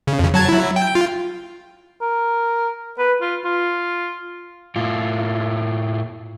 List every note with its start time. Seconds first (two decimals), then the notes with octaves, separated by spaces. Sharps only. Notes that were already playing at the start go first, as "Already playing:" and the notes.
0.07 C#3
0.19 F2 C#3
0.34 F#3 A5 G#6
0.49 F#3 E4
0.76 G5
0.95 F4
2.01 A#4
2.99 B4
3.21 F4
3.45 F4
4.76 A2 F4